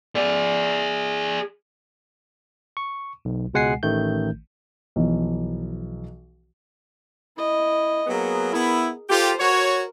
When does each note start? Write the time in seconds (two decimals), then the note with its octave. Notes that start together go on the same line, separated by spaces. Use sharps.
0.15 G#4 D5
2.77 C#6
3.25 B1
3.54 C#2 B2 G#3 F#5 G#5 C7
3.83 A1 D#3 A3 G6
4.96 B1 E3 F3
7.37 E4 D#5
8.07 F#3 A#3 B3 G#4 A#4
8.53 B3 E4
9.10 F4 G4 A4 C5
9.40 F#4 A#4 C#5